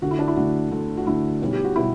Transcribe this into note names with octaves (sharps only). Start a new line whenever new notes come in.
D2 D3 A3 F#4
E4
D4
E4
D2 D3 A3 F#4
D2 D3 A3
F#4
D2 D3 A3 E4
B1 B2 G3
G4
F#4
B2 G3 E4